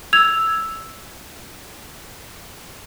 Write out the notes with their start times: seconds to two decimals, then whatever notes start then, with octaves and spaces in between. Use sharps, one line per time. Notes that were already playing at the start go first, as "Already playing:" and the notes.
0.13 E6 G#6 F7